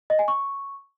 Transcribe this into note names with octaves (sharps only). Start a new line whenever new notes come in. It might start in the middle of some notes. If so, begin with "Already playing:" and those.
D#5
G#5
C#6